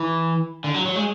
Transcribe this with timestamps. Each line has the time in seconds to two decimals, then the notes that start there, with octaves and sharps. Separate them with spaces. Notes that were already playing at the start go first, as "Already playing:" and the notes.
Already playing: E3
0.64 D3
0.74 F#3
0.85 F#3
0.96 G#3